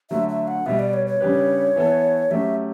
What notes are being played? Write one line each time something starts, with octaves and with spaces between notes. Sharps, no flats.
D3 F#3 A3 E5
E5
F#5
B2 G3 B3 E5
D5
C#5
C#5
C#3 G3 D4 G4 B4
E3 B3 E4 A4
F#3 A3 C#4 G4 E5